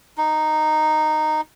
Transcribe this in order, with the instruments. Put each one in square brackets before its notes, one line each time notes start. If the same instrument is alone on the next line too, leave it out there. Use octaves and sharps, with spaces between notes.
[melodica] D#4